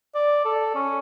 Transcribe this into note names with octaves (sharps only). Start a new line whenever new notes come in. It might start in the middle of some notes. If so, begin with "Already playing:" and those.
D5
A4
C#4